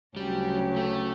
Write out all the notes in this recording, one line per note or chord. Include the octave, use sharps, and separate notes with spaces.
D2 C#3 F#3 G3 C#4 G4
A3